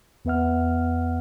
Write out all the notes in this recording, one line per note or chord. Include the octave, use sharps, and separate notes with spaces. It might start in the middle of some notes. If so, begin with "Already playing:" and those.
E2 B3 B4 E5 F#5 F6